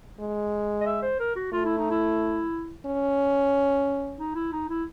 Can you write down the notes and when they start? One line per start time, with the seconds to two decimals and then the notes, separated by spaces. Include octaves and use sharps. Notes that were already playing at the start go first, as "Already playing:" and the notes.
0.20 G#3
0.81 D#5
0.86 E5
1.02 C5
1.20 A#4
1.36 F#4
1.53 A3 F4
1.65 E4
1.78 D#4
1.90 E4
2.86 C#4
4.19 D#4
4.35 E4
4.53 D#4
4.69 E4